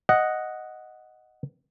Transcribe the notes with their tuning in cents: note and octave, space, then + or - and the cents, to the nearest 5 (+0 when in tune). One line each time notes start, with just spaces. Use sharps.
D#5 +0 F#5 +0